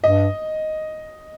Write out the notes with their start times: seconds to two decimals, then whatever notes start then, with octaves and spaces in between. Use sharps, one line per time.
0.03 G2 D#5